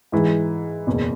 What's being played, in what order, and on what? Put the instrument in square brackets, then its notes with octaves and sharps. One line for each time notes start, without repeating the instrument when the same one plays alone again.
[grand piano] G#2 E3 G#3
F#1 E2 B2